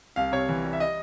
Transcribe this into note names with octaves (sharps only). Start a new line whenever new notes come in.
C2 F5
C3 C#5
E3
G3
E5
D#5